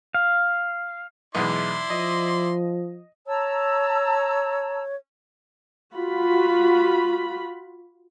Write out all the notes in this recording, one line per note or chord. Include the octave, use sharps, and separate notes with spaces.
F5
B1 E2 G#3 E4 D5 C6
F3 D#5
C#5 A5 A#5 E6
F4 F#4 B5